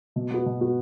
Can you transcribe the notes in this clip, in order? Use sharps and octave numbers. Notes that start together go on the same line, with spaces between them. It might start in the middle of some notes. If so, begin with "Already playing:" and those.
B2
B3 F#4
B2
B3 F#4